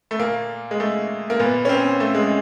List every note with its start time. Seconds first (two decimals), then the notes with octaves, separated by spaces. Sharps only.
0.11 A3
0.19 A#2 A#3
0.71 G#3
0.80 A3
1.30 A#3
1.39 A#2 B3
1.65 C#4
1.69 C4
2.00 A3
2.15 G#3